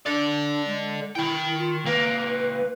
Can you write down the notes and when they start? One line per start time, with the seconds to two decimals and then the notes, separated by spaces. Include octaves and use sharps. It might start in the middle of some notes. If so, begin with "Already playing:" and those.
0.06 D4 A4 D5
0.67 G#3
1.15 D#3 E4 G5
1.58 F4
1.85 C#2 A#3 B4